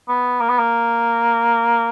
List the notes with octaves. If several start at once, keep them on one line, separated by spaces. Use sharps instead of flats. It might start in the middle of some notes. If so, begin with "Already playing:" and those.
B3
A#3
B3
A#3